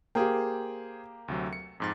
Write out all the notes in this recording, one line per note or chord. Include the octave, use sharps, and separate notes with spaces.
A#3 G4 G#4 C5 G5
D2 C3 F#3
C#7
F2 G#2 A6